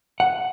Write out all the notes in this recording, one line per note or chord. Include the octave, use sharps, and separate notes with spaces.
F#5